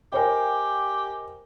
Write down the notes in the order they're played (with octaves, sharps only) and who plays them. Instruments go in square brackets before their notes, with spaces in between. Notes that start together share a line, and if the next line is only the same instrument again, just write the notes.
[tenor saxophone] G4 [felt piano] A#4 C5 G5 [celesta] D#5 G#5